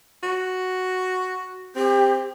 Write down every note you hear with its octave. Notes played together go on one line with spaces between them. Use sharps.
F#4
C4 G4